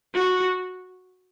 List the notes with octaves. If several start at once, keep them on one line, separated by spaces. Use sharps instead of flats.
F#4